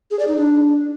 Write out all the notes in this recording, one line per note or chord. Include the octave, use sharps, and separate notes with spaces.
G#4
D5
D#4
D4